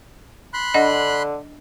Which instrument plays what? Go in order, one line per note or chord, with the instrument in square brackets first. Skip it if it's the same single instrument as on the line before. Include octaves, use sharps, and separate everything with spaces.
[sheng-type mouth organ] B5 C6 F#6
[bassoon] D3 [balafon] D4 D#5 F#5